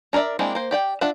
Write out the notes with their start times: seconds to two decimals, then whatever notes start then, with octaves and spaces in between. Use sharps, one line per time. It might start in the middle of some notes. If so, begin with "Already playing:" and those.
0.13 D4 A#4 C#5 D5 E5
0.39 G#3 A#3 C4 D4 E4
0.55 A#3 C5
0.71 G4 D5 G5
1.01 D4 F4 E5 F#5